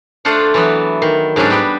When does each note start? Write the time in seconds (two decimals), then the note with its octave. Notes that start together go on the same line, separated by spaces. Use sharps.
0.25 A3 D4 F4 C5 F#5
0.54 E3 F#3 B3
1.02 D#3
1.36 G#2 C#3 F#3 C#4 D4
1.50 G3 B3 G4